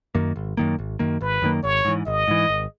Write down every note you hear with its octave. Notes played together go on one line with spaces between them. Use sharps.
F#2 D#3 A#3
G#1
F#2 D#3 A#3
G#1
F#2 D#3 A#3
G#1 B4
F#2 D#3 A#3
G#1 C#5
G#2 E3
G#1 D#5
G#2 E3
G#1